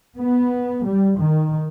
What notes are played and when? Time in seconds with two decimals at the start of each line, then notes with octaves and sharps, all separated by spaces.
0.19 B3
0.85 G3
1.19 D#3